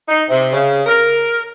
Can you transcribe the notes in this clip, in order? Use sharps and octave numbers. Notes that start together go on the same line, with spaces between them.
D#4
C3
C#3
A#4